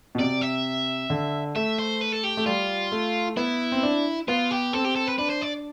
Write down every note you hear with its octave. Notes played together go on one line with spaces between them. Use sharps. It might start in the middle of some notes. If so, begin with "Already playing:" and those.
B2
C3 D5
E5
D3
A3 E5
C5
B4
A4
G4
A3
G3 F4
A3
B3 E4
C4
D4
B3 F4
G4
C4 A4
G4
A4
B4
D4 B4
C5
D5